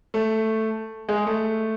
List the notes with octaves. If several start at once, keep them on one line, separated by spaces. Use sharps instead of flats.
A3
G#3
A3